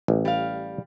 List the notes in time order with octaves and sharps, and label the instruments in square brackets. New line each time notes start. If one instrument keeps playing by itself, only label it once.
[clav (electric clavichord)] A1
[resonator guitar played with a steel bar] G3 F5